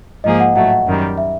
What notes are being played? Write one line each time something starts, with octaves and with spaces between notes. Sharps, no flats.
G#2 F3 A#3 D#4 G#4 D#5
F#5
A2 F#3 A3 F#5
F#5
F#2 D#3 G3
E5